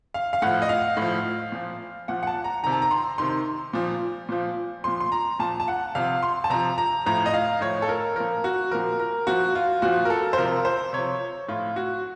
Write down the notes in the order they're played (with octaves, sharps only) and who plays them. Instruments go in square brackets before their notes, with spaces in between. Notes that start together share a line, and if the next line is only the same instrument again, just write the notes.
[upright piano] F5
F5
A2 F3 F#5
D#5
F5
A2
F3
A#2 F3
A#2 F3 F#5
F#5
A5
A#5
C3 D#3 A#5
A5
A#5
C6
C3 D#3 C6
A#2 F3
A#2 F3
A#2 F3 C6
C6
A#5
A#2 F3 A5
A5
F#5
C3 F3 F5
C6
A5
C3 F3 A#5
A#5
A2 F3 A#5
D#5
F5
A2 F3 C#5
A4
A#4
A#2 F3 A#4
F#4
A#2 F3 A#4
A#4
A#2 F3 F#4
F4
A#2 F3 F#4
A#4
A4
C5
C3 F3 A#4
C5
C3 F3 C#5
A2 F3 F4
F#4